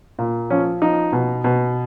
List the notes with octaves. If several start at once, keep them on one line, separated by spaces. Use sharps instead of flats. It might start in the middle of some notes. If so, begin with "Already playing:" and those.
A#2
F3 C#4
F3 D#4
B2
B2